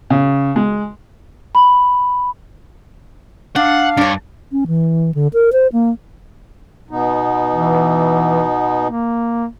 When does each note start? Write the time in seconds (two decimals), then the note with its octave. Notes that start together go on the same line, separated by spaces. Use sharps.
0.10 C#3
0.56 G#3
1.55 B5
3.56 D4 F5 F#5
3.97 G2 D4 C#5
4.52 C#4
4.67 E3
5.15 D3
5.33 A#4
5.53 C5
5.73 A#3
6.90 B2 B3 D#4
7.51 E3
8.84 A#3